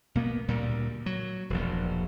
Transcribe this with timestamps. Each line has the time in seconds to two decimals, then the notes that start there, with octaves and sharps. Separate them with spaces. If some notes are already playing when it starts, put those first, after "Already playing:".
0.15 B2 A#3 B3
0.48 D2 A#2 G3
1.06 F#3
1.50 E1 A#1